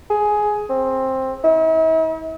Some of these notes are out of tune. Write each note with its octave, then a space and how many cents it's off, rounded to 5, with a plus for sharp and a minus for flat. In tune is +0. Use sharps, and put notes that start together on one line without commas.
G#4 +10
C4 +15
E4 -45